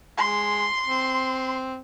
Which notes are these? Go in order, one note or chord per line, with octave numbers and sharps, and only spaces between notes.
G#3 C6
C4